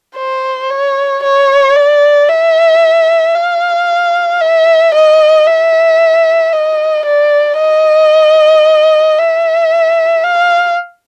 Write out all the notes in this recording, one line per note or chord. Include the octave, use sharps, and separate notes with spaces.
C5
C#5
C#5
D5
E5
F5
E5
D#5
E5
D#5
D5
D#5
E5
F5